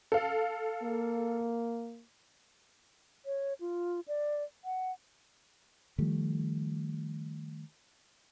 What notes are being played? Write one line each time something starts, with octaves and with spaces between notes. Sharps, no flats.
A4 F5
A#3
C#5
F4
D5
F#5
D#3 F3 G3 A3